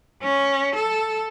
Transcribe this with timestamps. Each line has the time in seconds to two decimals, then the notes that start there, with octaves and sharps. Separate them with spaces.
0.23 C#4
0.76 A4